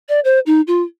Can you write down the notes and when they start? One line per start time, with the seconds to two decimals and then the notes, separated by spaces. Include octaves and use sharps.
0.09 D5
0.24 C5
0.46 D#4
0.67 F4